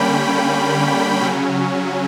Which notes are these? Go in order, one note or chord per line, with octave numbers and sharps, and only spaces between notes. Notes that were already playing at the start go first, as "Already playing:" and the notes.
Already playing: D3 G3 A#3 C#4 G5 B5
C#3 F#3 C#4